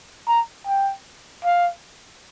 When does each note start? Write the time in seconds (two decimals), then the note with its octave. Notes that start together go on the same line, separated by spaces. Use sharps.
0.28 A#5
0.67 G5
1.45 F5